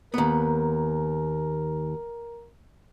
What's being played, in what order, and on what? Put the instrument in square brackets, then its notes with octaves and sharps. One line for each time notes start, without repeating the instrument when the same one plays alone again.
[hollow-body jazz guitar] D#2 B3 [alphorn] A#4